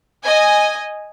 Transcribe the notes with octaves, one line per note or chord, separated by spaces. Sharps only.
D#5 G#5